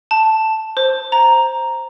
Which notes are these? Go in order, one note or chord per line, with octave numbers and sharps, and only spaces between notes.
A5
C5
A#5